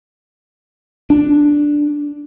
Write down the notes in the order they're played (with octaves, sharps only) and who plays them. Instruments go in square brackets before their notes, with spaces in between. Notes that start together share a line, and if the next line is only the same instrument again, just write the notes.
[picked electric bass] D4